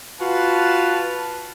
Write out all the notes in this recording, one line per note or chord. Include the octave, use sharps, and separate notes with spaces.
F4 F#4 B4 A5